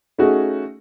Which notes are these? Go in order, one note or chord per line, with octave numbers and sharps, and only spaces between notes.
A3 C#4 D#4 F#4 G#4